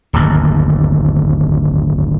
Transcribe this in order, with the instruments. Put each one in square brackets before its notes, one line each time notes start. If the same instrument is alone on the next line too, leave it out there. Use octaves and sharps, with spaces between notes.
[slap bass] D1 G1 D#2